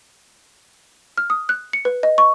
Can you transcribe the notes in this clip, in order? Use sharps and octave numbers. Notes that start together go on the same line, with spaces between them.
F6
D#6
F#6
C#7
B4
D#5
C#6